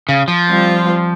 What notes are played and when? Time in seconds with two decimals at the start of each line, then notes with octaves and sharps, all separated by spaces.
0.09 C#3
0.28 F3
0.48 G3 C4 F4 C5